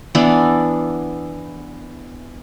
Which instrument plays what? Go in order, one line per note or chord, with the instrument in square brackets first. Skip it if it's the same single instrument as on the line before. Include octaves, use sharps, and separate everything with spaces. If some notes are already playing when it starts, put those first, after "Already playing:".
[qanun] E3 B3 D4